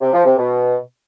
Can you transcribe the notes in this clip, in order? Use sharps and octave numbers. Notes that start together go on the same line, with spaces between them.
C3
F3
C3
B2